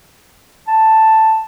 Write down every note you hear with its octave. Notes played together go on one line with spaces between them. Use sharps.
A5